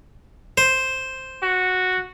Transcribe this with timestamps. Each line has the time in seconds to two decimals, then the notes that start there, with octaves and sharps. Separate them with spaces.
0.58 C5
1.43 F#4